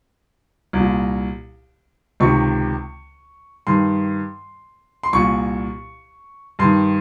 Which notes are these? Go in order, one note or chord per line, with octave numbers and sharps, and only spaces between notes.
C2 A#2
C#2 C3 D#3 C#6
G2 D#3 C6
C6
C2 A#2 C#6
G2 D#3 C6